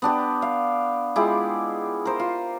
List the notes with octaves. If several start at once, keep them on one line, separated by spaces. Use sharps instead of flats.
B3 D4 G4
F5
G#3 E4 F4 G4
A#4 C5
F4